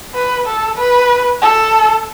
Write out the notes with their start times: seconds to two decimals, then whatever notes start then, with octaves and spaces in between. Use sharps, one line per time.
0.15 B4
0.47 A4
0.78 B4
1.42 A4